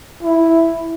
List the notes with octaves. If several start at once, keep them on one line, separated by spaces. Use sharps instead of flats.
E4